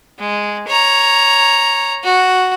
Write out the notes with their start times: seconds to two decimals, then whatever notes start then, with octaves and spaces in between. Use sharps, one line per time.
0.19 G#3
0.67 C#5 A#5
2.04 F#4